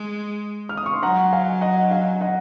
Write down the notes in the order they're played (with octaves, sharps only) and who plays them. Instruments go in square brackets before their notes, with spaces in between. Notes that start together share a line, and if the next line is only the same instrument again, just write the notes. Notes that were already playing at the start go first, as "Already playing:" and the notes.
Already playing: [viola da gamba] G#3
[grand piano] F6
D#6
C#6
C6
[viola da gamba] F#3 [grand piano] F#5 A#5
[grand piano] F5 G#5
D#5 F#5
F5 G#5
D#5 F#5